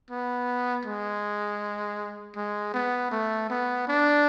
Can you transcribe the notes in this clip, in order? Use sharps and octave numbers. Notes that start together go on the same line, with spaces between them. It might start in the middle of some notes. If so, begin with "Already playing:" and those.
B3
G#3
G#3
B3
A3
B3
D4